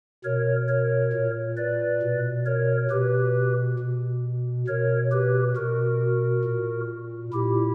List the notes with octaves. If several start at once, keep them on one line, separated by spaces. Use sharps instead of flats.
B2 A#4 C#5
A#4 C#5
A#2
B4 D5
B2
A#4 C#5
B2 G4 B4
B2
B2 A#4 C#5
G4 B4
B2 F#4 A#4
A#2
A#2 E4 G4